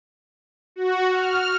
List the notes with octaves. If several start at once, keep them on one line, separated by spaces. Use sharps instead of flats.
F#4
F6